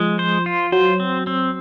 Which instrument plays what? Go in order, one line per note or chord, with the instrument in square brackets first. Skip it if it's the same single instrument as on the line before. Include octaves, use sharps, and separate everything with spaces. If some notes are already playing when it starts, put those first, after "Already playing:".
Already playing: [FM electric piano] F3 [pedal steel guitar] G#3
[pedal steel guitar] C5
F4
[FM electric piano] F#3 [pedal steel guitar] C5
[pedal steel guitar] C4
C4